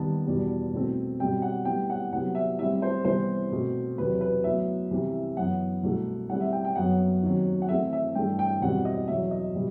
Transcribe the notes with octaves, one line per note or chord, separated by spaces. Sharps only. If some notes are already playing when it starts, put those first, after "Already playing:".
Already playing: D#2 D#3 G3 B3 A5
E2 B2 G3 B3
C2 B2 A3 C4
B2 G3 C4 G5
F#5
A2 G3 B3 G5
F#5
C2 C3 F#3 B3 F#5
E5
A2 G3 C4 E5
C5
C2 C3 E3 G3 B3 C5
B2 A3 C4
E2 C3 F#3 B4
B4
A2 F#3 B3 E5
C2 C3 E3
F#2 E3 B3 F#5
C2 B2 A3
A2 G3 C4 F#5
E5
G5
G5
F#2 F#3 B3 F#5
D#2 D#3 F#3 C4
F#5
A2 E3 A3 C4 E5
E5
G2 E3 A3 G5
G5
E2 B2 G3 C4 F#5
D#5
E2 B2 F#3 E5
D#5
B2 G3